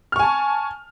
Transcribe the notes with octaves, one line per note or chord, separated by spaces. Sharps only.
G#5 A5 C#6 F6